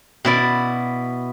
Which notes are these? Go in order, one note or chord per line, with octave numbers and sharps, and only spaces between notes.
B2 E4 D5